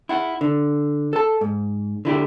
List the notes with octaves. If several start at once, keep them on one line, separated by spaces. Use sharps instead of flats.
E4 F#5
D3
A4 A5
G#2
D3 E4 G4